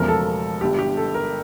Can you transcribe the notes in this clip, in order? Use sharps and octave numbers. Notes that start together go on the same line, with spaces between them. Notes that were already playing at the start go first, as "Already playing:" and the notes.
Already playing: E1 E2 C#3 F3 A3 A#4
A4
G1 G2 D3 G4
G4
A4
A#4